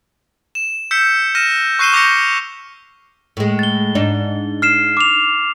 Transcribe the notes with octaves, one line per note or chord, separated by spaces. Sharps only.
E7
E6 G6 B6 C#7 E7
F6 A#6 D#7 E7
C#6 F#6 C7 D#7 E7 G7
D6 G6 A#6 C#7
A2 G#3
A6 G7
G#2 D4 D#4
F6 C7 E7
D6 F7